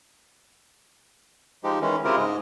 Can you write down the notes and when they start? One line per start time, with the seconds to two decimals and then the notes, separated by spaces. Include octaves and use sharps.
1.64 F3 G#3 D#4 G4
1.81 D#3 E3 G#3 C#4
2.04 C#3 C4 E4 F4 G4 A#4
2.16 G#2 G#3 D#5